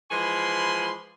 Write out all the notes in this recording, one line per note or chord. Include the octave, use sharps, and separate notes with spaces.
E3 F3 G#3 G#5 B5 C6